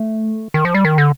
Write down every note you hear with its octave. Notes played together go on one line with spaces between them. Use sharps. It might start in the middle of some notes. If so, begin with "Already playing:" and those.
Already playing: A3
D#3
F3
G3
D#3
D3